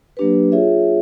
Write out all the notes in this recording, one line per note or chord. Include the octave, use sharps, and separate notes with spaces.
F#3 A#3 D4 G4 B4
F4 G#4 C#5 E5